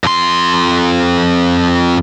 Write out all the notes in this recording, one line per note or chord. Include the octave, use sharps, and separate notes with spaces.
F2 C6